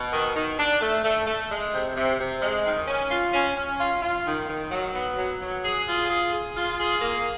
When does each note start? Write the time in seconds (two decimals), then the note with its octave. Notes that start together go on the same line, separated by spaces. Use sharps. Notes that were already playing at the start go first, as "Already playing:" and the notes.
Already playing: B2
0.12 D#3
0.35 D#3
0.58 D4
0.81 A3
1.04 A3
1.27 A3
1.50 G#3
1.73 C3
1.96 C3
2.19 C3
2.42 G#3
2.65 D#3
2.88 C#4
3.11 F4
3.34 C#4
3.57 C#4
3.80 F4
4.02 F4
4.26 D#3
4.48 D#3
4.71 F#3
4.94 B3
5.18 F#3
5.40 F#3
5.64 G#4
5.86 F4
6.10 G#4
6.33 G#4
6.55 F4
6.79 G#4
7.01 A#3